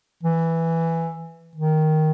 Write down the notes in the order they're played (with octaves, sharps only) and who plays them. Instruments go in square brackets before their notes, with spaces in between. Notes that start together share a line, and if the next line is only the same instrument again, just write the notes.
[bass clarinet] E3
D#3